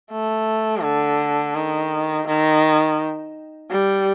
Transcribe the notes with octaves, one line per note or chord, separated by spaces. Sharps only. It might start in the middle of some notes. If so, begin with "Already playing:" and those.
A3
D3
D#3
D#3
G3